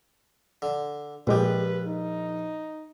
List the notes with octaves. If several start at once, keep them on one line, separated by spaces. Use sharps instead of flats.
D3
A#1 A#2 F3 G#3 G4 B4
D#4